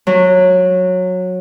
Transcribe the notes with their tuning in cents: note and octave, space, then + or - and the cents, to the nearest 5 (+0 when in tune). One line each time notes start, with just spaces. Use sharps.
F#3 -15